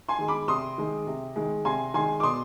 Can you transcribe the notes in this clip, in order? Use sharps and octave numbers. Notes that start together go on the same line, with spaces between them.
G#5 C6
D#3 G#3
B5 D6
C3 C6 D#6
D#3 G#3
C3
D#3 G#3
C3 G#5 C6
D#3 G#3 G#5 C6
D6
B2 C6 D#6